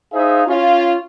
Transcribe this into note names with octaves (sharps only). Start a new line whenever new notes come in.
D#4 G#4 C5 E5 F5
C#4 F4